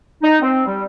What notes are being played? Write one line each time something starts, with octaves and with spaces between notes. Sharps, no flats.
D#4
C4
G3